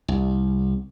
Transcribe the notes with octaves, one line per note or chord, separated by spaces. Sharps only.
C2